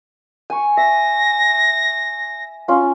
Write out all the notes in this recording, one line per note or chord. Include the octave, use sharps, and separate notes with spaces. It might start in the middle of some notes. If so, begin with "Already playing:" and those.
G#5 C#6
E5 A#6
C#4 F4